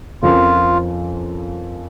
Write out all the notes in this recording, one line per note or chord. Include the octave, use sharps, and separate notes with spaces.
F2 F3 C#4 F4 A#4